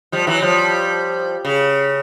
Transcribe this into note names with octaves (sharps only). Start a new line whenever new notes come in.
F3 G3
E3 F#3
F3 G3
C#3